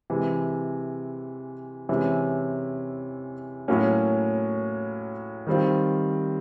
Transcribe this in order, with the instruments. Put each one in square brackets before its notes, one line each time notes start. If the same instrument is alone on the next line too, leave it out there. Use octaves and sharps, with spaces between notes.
[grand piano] C3 E3 G#3
C3 E3 G#3 C#4 E4
A2 F#3 A#3 C#4
D#3 G3 C4 F4